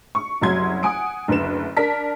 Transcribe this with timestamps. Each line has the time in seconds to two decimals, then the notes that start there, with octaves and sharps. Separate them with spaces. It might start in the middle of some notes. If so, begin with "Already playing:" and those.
0.15 C#6
0.41 F#1 C2 F#3 C6 G#6
0.83 F#5 G#5 D#6 D7
1.28 F#1 D2 B4 E7
1.77 D4 A#4 A5 B6